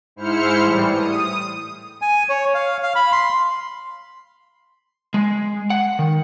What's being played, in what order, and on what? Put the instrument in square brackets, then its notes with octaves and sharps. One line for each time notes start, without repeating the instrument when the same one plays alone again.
[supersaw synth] G#2 E4 C5 F6 C#7
A2 E3 G3
D#6
[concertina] G#5
C#5
F5
F5
B5
C6
[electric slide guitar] G#3
F#5
D#3